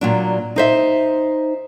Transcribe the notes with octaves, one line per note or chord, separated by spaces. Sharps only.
A#2 F#3 D4
D#4 C5 E5